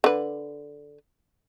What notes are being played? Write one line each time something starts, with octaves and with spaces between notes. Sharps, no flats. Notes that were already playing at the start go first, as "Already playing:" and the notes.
D3 B4